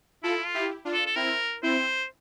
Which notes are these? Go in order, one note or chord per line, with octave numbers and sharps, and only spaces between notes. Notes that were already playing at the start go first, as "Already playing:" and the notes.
E4 F4 A4
F4
E4 G4
D4 F4
A4
A4
C4 E4 A#4
C4 E4 C5